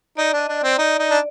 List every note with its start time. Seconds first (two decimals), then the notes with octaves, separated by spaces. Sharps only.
0.17 D#4 D5
0.33 D4 D#5
0.49 D4
0.58 D5
0.63 C4
0.78 D#4 D5
0.99 D#4
1.11 D4